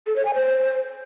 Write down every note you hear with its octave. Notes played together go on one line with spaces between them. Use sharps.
A4
C#5
G#5
C5